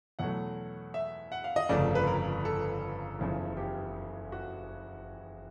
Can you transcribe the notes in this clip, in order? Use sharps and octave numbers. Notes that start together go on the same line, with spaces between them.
E2 B2 F#3 A3 F#5
E5
F#5
F5
D#5
G1 F2 C#3 F3 A3 D5
B4
A#4
A4
F#1 E2 C#3 F3
G4
F#4